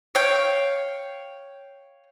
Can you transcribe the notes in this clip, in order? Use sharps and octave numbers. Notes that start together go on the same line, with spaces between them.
C#5 F5 G5